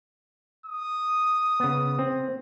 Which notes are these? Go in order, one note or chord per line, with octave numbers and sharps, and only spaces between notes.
D#6
C#3 B3
C4